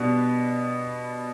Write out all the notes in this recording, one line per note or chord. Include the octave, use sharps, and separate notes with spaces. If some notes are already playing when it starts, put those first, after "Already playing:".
Already playing: B2 G3 B3 D4